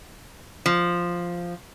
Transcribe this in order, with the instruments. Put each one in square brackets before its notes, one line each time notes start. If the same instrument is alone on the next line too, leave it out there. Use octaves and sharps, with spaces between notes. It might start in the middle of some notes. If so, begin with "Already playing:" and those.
[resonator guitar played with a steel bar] F3